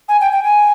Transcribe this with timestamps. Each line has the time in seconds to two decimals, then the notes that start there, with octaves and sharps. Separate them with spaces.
0.08 G#5
0.21 G5
0.32 G5
0.44 G#5